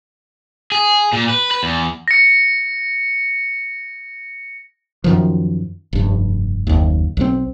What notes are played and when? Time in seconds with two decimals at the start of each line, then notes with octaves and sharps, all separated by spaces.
0.72 G#4
1.13 A#2
1.29 B4
1.51 B4
1.63 E2
2.08 A#6 C#7
5.04 F#2 D#3 F3
5.93 F1 G2
6.67 F#1 D#2
7.17 B1 F#3 C4